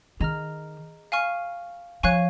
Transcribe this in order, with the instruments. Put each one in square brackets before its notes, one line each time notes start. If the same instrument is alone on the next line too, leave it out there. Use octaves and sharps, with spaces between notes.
[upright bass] D#3 [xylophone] G#4 D#5 A#5 F6
[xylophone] F5 G#5 C#6 F6
[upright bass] F3 [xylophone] C#5 F5 G#5 C#6 F#6